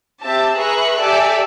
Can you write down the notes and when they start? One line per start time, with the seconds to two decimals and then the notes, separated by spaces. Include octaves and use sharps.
0.22 C4 G4 E5 A5
0.58 G#4 B4 E5 A#5 C#6 F#6
0.99 G4 A4 D5 E5 G#5